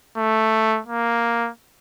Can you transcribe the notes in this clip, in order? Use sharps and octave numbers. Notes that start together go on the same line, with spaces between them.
A3
A#3